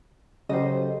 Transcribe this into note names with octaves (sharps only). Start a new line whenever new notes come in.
C#3 F#3 G4 A4 C5 D#5